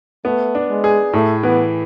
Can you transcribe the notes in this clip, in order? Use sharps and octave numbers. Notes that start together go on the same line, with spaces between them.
A3 B3
D4
G#3
G#4
A2 A3
E3 B3